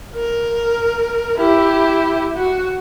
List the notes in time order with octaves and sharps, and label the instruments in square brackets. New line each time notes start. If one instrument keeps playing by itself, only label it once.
[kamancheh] A#4
E4 G4
F#4